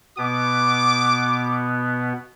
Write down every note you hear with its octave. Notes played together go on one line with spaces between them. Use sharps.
B2 B3 D6